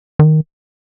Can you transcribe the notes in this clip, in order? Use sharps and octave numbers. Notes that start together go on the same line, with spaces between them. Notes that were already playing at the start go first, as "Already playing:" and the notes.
D#3